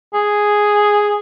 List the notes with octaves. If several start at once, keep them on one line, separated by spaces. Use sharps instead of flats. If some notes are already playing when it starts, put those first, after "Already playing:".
G#4